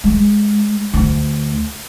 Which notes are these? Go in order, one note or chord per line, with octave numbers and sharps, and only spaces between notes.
G#3
D2